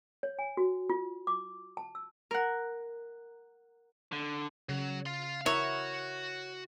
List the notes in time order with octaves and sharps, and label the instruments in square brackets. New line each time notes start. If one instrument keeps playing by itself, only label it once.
[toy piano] C#5
G#5
F#4
F4
D6
A5
E6
[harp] A#4 F#5
[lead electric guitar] D3
[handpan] C#3 [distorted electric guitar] F#3
[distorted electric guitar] F5 C6
[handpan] E4 A#4 E5 [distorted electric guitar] F#4 [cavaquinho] C#5